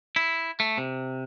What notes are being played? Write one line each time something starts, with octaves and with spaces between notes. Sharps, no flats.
E4
A3
C3